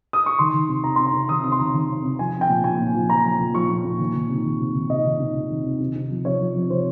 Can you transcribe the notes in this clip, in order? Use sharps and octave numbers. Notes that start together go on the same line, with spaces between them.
D#6
C#6
D#3 C6
D#3
C3
C3 A#5
C3 C6
A#5
C3
D#3 D#6
C3 D#6
C6
D#3 A#5
D#3
C3
C3
F3 G#5
F3
G5
A#2
A#2 G#5
A#2
F3
F3 A#5
F3
A#2
F3 C#6
A#2
A#2
D#3
D#3
C3
D#3
C3
D#3
C3 D#5
D#3
C3
C3
D#3
C3
C3
C3
F3
C3 C#5
F3
F3
C3 C5